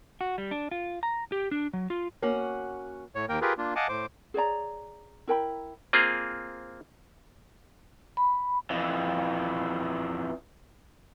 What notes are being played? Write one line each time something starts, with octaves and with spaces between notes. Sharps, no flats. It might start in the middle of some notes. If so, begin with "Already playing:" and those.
F#4
G3
D4
F4
A#5
G4
D4
F#3
F4
A#3 C#4 F#4 F#5
A2 C#5
D#2 A#3 A#4 G5
F4 G4 G#4 A#4 B4
A#3 D4 F4
D#5 F5 F#5 G#5 A5 D6
A2 C5 D6
G#4 C#5 D5 A#5
E4 A#4 G5 B5
A#3 C4 F4 G#4
B5
F2 E3